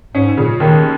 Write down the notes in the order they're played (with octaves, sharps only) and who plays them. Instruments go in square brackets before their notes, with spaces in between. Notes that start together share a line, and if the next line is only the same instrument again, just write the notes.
[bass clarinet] G#2 [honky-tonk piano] C#4
[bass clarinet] A#2 [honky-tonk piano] C#3
[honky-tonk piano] D#2 [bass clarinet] D#3